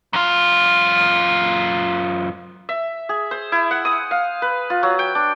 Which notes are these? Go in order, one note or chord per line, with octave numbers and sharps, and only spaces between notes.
F#2 F4
E5
G#4
C5
E4
F#5
D#6
F5
B4
F4
F#3
G5
D4